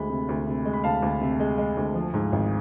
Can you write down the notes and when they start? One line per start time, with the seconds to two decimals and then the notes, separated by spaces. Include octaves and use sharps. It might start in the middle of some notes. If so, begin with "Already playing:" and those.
Already playing: D2 G#3 B5
0.10 C3
0.29 D2
0.47 C3
0.65 G#3
0.73 B5
0.84 D2 F5 A5
1.02 D2
1.21 C3
1.40 G#3
1.58 G#3
1.77 D2
1.94 F3
2.14 G#2
2.32 G#1